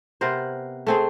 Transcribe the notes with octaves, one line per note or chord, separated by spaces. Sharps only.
C3 B3 A#4 C5
A3 C4 G#4